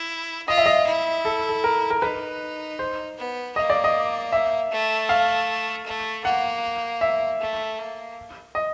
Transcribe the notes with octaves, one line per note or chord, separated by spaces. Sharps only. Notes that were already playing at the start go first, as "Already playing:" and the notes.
Already playing: E4
F4 D#5
E5
D#5
E4
A4
A4
A#4
A#4
D#4 B4
C5
B3
A#3 D#5
D5
D#5
E5
A3
F5
A3
A#3 F#5
E5
A3
A#3
D#5